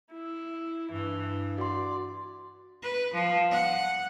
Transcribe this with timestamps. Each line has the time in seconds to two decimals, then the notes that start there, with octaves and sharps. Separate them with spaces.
0.13 E4
0.92 G2 E3
1.58 F#4 D5 C6
2.82 B4
3.14 F3
3.51 F#5